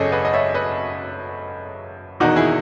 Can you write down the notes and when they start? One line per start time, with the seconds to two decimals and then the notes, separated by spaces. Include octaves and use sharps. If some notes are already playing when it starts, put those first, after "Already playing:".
Already playing: G#1 F#2 C#3 G#4 A4 C#5 D#5
0.12 B4 D#5
0.25 D#5
0.34 C#5 E5
0.54 B4 D#5
2.20 E1 E2 D#3 D#4 F#4
2.36 E4 G#4